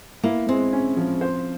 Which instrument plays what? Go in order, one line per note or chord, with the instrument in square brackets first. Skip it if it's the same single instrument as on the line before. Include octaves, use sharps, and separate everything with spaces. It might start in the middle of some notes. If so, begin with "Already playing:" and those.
[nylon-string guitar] A#3 [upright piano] E4
[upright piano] G#3 [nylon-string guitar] C4
[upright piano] C#4
F3
C5